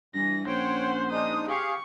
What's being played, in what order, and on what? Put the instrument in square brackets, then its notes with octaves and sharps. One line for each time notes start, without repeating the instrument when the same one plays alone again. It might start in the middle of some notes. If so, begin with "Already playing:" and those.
[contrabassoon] G2 [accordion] E3 [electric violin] A#6
[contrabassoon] A#1 [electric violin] C#4 C5 [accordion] C#5 G5 [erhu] F#5
[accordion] G#3 D4 D#4 [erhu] D#6
[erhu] G4 [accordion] G#4 F5 [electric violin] C#6